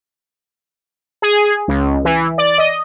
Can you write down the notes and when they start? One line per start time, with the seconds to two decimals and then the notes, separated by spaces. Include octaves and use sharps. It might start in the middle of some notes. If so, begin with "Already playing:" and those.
1.22 G#4
1.68 C#2
2.05 E3
2.38 D5
2.58 D#5